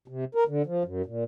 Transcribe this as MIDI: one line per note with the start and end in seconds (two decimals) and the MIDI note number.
0.08 0.25 48
0.35 0.44 70
0.48 0.62 50
0.66 0.83 53
0.85 1.02 42
1.06 1.24 46